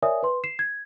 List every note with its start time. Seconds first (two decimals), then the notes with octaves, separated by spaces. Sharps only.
0.02 A#4 C#5 D5 E5 G#5 D#6
0.23 B4 C6
0.44 C7 E7
0.59 G#6